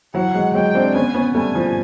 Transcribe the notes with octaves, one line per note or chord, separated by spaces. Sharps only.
E3 F#3 F#5
F#3 G#3
F#3 G#3 G5
C4 D4
B3 C#4 G#5
B3 C#4
G3 A3 G#5
F3